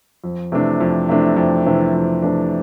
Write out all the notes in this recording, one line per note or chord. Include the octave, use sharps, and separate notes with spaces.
F2
C3 E3 A3 D4
F2
C3 E3 A3 D4
F2
C3 E3 A3 D4
F2
C3 E3 A3 D4